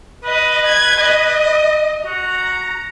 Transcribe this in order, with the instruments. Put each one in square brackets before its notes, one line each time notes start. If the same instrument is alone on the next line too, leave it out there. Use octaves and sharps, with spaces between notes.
[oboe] B4 [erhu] D#5
[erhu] G#6
D#5
[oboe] F#4 [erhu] A#5